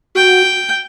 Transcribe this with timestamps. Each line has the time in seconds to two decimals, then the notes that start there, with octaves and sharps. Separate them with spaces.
0.15 F#4 G5